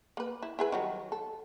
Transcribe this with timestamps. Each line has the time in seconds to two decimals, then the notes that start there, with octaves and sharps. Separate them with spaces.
0.17 A#3 B4
0.42 E4
0.59 E4 G#4 B4
0.72 D#3 F#3 G3
1.12 A4